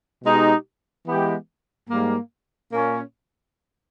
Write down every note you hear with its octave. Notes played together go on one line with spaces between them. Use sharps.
B2 G#3 D#4 G4
E3 G#3 B3 G4
G#2 G3 A#3
A#2 A#3 C#4